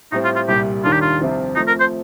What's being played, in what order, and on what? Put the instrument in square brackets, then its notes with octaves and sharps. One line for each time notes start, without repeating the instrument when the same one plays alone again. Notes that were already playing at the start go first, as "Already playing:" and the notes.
[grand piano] A2 G3 C4 [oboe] D#4
[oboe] F4
F4
[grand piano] C2 A#2 G3 [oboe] G4
[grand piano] D#2 D#3 G3 D4 [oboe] F4
[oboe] G4
F4
[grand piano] C2 C3 F3 C4 F4
[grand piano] F3 A3 C4 [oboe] D#4
[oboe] A#4
C5